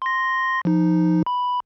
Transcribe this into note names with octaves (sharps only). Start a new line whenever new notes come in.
C6 A#6
F3 D#4
B5